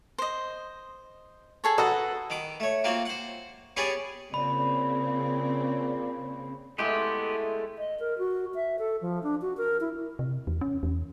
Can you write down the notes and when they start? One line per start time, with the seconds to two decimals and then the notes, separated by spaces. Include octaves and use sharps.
0.18 C5 D#5
1.64 G#4 A4 C#5
1.78 F#4 A4 B4 A#5 D#6
2.30 D#3 D6
2.60 A3 C#5
2.84 A#3 C4 F4 F#4
3.05 C5 F#5
3.77 B3 C#4 G4 G#4 C#5 D5
4.34 C#3 A#3 C4 F4 D5 B5
6.78 G#3 A3 B3 E4 G4
7.78 D#5
8.00 A#4
8.18 F#4
8.55 E5
8.79 A4
9.01 F3
9.23 D4
9.42 F#4
9.57 A#4
9.81 E4
10.19 C3
10.47 E2
10.61 C#4
10.83 E2